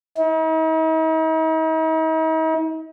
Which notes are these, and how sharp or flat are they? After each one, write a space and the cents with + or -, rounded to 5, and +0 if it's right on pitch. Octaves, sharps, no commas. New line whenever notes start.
D#4 +45